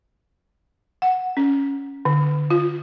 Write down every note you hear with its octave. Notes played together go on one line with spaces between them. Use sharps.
F#5
C#4
D3
F4